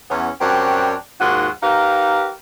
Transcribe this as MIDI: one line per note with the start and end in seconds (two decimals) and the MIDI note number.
0.09 0.29 40
0.09 0.29 59
0.09 0.29 61
0.41 0.93 42
0.41 0.93 60
0.41 0.93 62
0.41 0.93 66
0.41 0.93 67
1.19 1.47 39
1.19 1.47 44
1.19 1.47 65
1.19 1.47 66
1.19 1.47 78
1.61 2.29 63
1.61 2.29 67
1.61 2.29 70
1.61 2.29 71
1.61 2.29 77